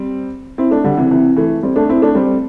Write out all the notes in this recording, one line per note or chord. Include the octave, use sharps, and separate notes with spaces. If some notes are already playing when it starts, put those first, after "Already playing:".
Already playing: G3 C4
C4 E4
A3 D4
D3 G3
C3 E3
C3 E3
E3 A3
G3 C4
A3 D4
C4 E4
A3 D4
G3 C4